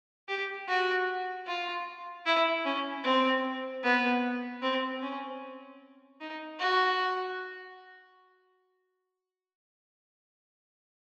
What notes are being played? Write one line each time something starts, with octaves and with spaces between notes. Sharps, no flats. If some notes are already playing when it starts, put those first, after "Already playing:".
G4
F#4
F4
E4
C#4
C4
B3
C4
C#4
D#4
F#4